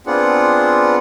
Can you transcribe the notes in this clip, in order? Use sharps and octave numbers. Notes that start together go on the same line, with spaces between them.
B3 C4 D4 F4 G#4 F#5